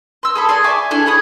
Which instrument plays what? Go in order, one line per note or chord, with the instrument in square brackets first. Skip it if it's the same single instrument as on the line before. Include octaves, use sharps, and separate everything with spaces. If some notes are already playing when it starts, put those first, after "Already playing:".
[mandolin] C6 E6
G#4 A4 B5
G#4 D5 G#5 C6
E5 G#5 C#6 D6
D4 E4 G#4 A4
G#4 C#5 B5 D#6